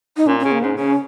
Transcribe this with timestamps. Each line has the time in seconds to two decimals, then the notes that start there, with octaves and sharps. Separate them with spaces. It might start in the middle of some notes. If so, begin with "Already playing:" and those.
0.17 D#4
0.27 A#2 C#4
0.40 C#3 C#4
0.52 A#3
0.61 G#2 C#4
0.76 C#3 C#4